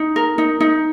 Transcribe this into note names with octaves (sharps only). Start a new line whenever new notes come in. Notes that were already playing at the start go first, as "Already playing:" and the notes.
Already playing: D#4
A#4
D#4
D#4